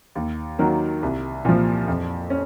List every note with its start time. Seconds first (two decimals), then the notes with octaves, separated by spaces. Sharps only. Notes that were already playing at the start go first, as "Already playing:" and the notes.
0.15 D#2
0.59 D#3 F#3 A#3
1.02 C2
1.45 A#2 F3
1.88 F2
2.30 C#4